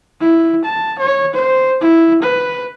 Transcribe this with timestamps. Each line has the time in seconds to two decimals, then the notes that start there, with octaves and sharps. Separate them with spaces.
0.21 E4
0.65 A5
0.99 C#5
1.34 C5
1.81 E4
2.22 B4